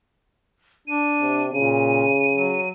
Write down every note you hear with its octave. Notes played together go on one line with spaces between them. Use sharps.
D4 D#7
C3
A#2 C#3 D#7
F#3